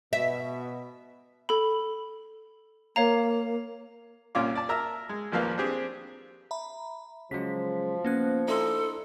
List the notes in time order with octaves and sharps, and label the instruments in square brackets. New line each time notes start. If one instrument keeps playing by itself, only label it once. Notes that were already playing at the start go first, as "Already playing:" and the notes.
[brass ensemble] B2 [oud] E5
[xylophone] A4 B5
[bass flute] A#3 [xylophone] C#5 F5 A#5
[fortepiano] C2 A#2 C#4 F4 F5 D6
D5 A5
A#4 E5 A#5 E6
G#3
A1 D#2 F3 A#3 B4 F5
C4 D4 G4 G#4
[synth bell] E5 A#5 B5
[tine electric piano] C#3 F#3 G#3 [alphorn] F3 [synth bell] B6
[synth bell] A#3 C#4 F#6 [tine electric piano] B3
[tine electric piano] D4 E4 D#5 [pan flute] A4 [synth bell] A#5 C6